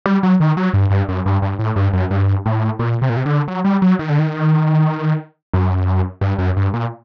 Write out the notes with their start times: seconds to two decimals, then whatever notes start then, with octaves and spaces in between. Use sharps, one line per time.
0.06 G3
0.23 F#3
0.40 D#3
0.57 F#3
0.74 G2
0.90 G2
1.09 F#2
1.26 G2
1.42 G2
1.59 A2
1.76 G2
1.93 F#2
2.11 G2
2.46 A2
2.79 A#2
3.02 C3
3.09 A#2
3.17 C3
3.26 D3
3.48 F#3
3.64 G3
3.82 F#3
3.99 D#3
4.09 D3
4.19 D#3
5.53 F#2
6.21 G2
6.38 F#2
6.57 G2
6.74 A#2